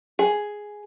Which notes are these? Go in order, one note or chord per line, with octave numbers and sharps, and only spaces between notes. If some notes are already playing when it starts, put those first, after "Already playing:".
G#4